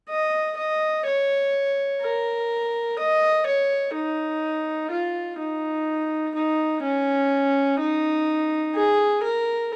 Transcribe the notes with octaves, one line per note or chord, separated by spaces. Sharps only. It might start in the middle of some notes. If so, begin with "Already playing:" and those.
D#5
D#5
C#5
A#4
D#5
C#5
D#4
F4
D#4
D#4
C#4
D#4
G#4
A#4